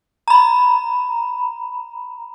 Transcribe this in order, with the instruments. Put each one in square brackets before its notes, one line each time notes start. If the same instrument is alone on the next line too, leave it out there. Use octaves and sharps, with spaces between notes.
[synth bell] A#5 B5